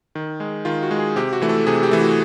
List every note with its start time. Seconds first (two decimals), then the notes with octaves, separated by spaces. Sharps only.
0.15 D#3
0.40 G#3
0.65 D#3 F4
0.83 F#4
0.91 G#3
0.99 G#4
1.16 C3 G4
1.33 F#4
1.42 E3 A3
1.49 A4
1.67 C3 G#4
1.83 G4
1.91 E3 A3
2.00 F#4